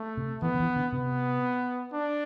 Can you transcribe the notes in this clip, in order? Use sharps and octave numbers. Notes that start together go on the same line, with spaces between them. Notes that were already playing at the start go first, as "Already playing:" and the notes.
Already playing: A3
C3
E3 B3
D3
E3
D3
C3 B3
D4